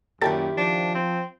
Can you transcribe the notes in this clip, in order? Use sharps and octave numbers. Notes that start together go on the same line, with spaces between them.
F#2 A#2 D#3 E4 G4 A4 A6
F3 D4
C4